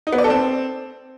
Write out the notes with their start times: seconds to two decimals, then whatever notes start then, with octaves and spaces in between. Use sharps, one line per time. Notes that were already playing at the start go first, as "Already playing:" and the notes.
0.07 D#4
0.13 B3
0.18 D5
0.24 A4
0.30 C4